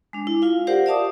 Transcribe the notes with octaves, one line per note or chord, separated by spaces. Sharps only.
G#3 D4
E4
F4 F5
G4 A#4 C5 D5 F5 F#5
D5 E5 F5 A5 D6 D#6